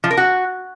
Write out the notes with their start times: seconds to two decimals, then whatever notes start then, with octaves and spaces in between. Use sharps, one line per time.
0.04 F3
0.11 A#4
0.17 F#4